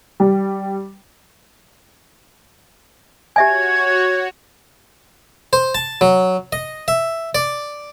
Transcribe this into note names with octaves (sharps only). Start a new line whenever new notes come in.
G3
F#4 G4 C#5 E5 G#5 G#6
C5
A5
F#3
D#5
E5
D5